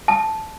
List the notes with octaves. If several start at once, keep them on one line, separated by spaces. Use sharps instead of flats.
A5